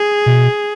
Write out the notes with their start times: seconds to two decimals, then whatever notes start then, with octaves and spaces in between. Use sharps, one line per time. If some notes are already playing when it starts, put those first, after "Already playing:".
Already playing: G#4
0.26 B2